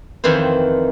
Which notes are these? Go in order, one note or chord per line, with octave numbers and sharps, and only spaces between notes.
F2 D#3 E3 E4 C5